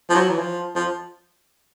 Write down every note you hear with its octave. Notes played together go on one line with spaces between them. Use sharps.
F3
F#3
E3
F3
F3